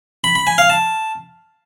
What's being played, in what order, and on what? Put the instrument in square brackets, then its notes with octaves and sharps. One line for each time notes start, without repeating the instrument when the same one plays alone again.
[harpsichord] B5
B5
G#5
F5
A5